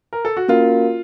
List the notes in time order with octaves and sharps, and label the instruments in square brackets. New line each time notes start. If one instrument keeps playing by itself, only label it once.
[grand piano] A#4
A4
F#4
[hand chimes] A#3 C#4 F#4 A#4 F5 [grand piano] F4